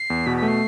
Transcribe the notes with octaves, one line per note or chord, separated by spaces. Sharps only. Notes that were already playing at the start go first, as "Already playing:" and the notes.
Already playing: C7
E2
B2 B6
B6
A3
C7